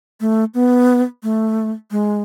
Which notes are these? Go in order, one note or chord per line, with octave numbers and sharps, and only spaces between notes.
A3
B3
A3
G#3